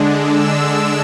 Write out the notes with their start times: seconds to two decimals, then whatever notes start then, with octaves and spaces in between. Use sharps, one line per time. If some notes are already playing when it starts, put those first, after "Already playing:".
Already playing: D3 G#3 D4
0.19 E6